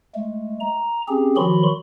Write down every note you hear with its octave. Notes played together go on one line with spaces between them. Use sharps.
G#3 A3
A#5
C4 C#4 G4 G#4
D#3 F3 F#3 F#4 B5 C6